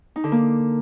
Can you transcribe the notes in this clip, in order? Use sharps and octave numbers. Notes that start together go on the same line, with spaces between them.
D#4
D3
A#3